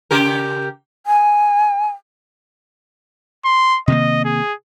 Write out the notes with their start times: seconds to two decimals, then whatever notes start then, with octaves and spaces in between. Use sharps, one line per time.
0.11 C#3 G4 A#4
1.07 G#5
3.45 C6
3.88 C3 D#3 A#3 D#5
4.25 G#4